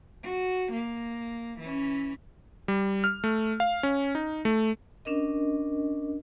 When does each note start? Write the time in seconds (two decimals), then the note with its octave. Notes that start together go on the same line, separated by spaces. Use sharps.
0.23 F#4
0.72 A#3
1.60 E3 C#4
2.68 G3
3.04 F6
3.24 A3
3.60 F5
3.83 C#4
4.15 D#4
4.45 A3
5.05 C#4 D4 A#4 D#5